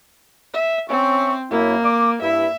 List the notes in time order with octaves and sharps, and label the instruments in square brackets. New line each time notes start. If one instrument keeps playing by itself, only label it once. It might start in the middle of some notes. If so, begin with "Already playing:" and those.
[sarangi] E5
[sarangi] C4 [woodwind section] C#4 E5 C#6
[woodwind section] F#2 E4 [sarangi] A#3
[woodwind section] D6
[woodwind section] G2 E4 [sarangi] E5